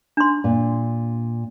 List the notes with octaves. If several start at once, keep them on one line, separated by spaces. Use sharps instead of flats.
D4 C6
A#2